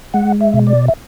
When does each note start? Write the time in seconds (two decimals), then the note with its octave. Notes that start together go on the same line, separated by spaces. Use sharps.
0.14 G#3 F#5
0.41 E5
0.54 B2
0.67 D5
0.88 E5